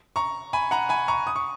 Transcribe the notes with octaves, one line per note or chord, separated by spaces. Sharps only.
A#5 C#6
G#5 B5
F#5 A#5
G#5 B5
A#5 C#6
D#6
C#6